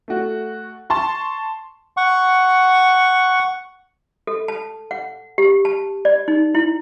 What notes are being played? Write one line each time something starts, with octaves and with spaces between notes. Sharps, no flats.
A3 F#4
A5 C6 C#6
F#5 C#6
A4
A5
F#5
G4
A5
D5
D#4
E4